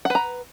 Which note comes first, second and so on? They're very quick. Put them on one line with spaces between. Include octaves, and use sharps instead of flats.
F#5 B4 A#5